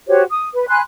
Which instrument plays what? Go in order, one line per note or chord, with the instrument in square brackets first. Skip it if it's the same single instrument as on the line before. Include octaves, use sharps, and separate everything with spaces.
[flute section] F#4 G4 C5 C#5
D#6
B4
G#5 B5 C6 F#6